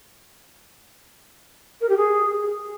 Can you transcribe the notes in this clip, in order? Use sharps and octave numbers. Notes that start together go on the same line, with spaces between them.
A#4
G4
G#4